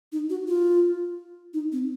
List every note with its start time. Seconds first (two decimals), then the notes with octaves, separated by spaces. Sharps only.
0.12 D#4
0.30 F#4
0.48 F4
1.54 D#4
1.72 C4